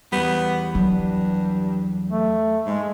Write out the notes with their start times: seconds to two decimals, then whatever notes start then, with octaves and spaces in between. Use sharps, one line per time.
0.12 E2 G3 B3
0.75 G2 F#3
2.08 A3
2.66 G#2 G#3